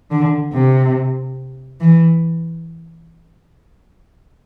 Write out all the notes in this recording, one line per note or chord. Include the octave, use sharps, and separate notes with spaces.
D3
C3
E3